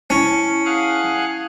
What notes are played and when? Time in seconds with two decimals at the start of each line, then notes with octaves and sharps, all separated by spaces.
0.10 C#4 E4 A5
0.65 G#4 F5 F#5